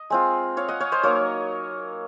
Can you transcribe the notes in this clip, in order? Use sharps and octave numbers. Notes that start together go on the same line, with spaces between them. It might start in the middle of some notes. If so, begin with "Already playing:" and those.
Already playing: D#5
G#3 C4 F4
C#5 F5
D#5 F#5
C#5 F5
C5 D#5
F#3 A#3 D#4 A#4 C#5